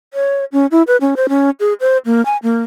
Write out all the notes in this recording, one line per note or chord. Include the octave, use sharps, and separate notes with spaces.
C#5
C#4
E4
B4
C#4
C5
C#4
G#4
C5
A#3
G#5
A#3